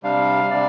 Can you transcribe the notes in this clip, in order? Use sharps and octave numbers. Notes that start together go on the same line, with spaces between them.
C3 G3 D4 F5
C3 G3 D4 D5